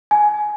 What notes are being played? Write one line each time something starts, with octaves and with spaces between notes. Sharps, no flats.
G#5